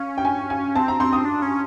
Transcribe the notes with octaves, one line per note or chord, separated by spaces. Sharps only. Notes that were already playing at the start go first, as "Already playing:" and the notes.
Already playing: C#4 F5
G5
G#5
G#5
C4 A5
A#5
C4 C6
D#6
D4
C#4